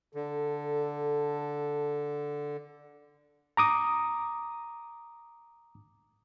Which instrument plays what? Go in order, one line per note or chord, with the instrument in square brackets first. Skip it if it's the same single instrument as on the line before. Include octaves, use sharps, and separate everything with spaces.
[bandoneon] D3 [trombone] A4
[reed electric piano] A#5 D6 D#6